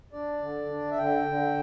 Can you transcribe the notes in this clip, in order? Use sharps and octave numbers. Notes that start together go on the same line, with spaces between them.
D4 D5
D3
D4
E5
D3 G5
D3